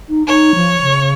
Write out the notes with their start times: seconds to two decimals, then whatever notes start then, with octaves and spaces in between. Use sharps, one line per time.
0.09 D#4
0.27 D#4 C#5
0.55 F3
0.82 C#3